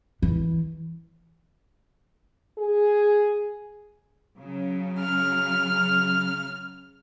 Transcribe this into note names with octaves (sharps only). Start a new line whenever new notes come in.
E3
G#4
C#3 F#3
F6